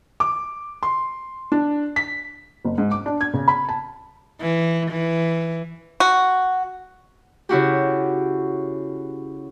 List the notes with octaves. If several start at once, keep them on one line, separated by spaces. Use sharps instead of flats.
D6
C6
D4
B6
F#1
G#2
D6
D4
G#6
C#3
B5
A5
E3
E3
F#4
C#3 E4 F#4 G4